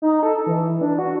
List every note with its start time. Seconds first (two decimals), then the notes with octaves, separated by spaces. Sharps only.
0.02 D#4
0.23 A4
0.47 E3
0.81 D4
0.99 F#4